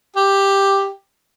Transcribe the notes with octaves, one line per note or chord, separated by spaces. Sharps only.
G4